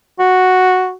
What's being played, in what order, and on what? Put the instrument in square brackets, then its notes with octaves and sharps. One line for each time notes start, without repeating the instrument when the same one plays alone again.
[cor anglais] F#4